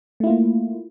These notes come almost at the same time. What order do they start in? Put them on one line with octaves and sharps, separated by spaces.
A3 E4 F4 A#3